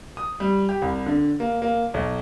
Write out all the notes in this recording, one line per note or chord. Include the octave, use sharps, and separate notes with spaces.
D#6
G3
G4
C2
D3
A#3
A#3
B1